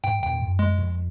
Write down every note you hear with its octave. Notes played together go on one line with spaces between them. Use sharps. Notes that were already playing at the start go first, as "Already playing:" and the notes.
G#2 G5
E2 A#2 A#3 G5
F#2
G#3
F2